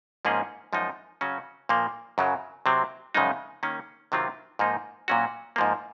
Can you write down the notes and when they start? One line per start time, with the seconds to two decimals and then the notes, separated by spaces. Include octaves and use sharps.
0.25 G#2 F3 A#3 C#4 G#4
0.73 F#2 F3 G#3 D#4
1.21 C#3 F#3 C#4 F#4
1.69 A#2 F3 A#3
2.18 F#2 C#3 F#3
2.66 C3 F#3 C4
3.14 F#2 C#3 F3 G#3 D#4
3.63 D#3 A#3 C#4
4.12 C3 D#3 F#3 C4 F4
4.59 G#2 F3 A#3 D#4
5.08 A#2 F#3 C#4 F#4
5.56 G#2 F3 A#3